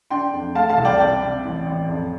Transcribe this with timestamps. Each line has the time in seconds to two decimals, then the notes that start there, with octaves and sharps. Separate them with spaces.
0.10 D4 G5 C6
0.33 F2
0.55 A3 F5 A5
0.69 F5 A5
0.78 C2
0.85 D5 G5
0.99 C3 D5 G5
1.22 C3
1.44 A1
1.66 A1
1.89 F2